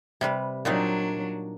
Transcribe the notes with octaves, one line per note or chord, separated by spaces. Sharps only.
C3 G3 B4
A#2 F#3 C4 D4 D#4